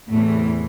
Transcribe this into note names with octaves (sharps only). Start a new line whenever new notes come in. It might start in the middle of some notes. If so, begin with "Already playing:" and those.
E2 A2 C3 E3 A3